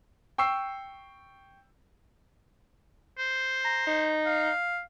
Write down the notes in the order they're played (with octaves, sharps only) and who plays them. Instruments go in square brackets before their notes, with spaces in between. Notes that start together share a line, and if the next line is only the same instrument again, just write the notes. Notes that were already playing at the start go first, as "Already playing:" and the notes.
[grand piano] G5 C#6 E6 C7
[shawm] C5
[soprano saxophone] A#5
D#4
[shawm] F5